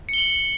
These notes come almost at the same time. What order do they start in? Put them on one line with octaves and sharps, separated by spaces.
C#7 G7 F#7